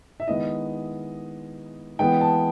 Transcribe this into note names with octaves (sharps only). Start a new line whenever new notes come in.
E5
D#3 G#3 B3 E4 D#5
E3 G#3 B3 G5
A5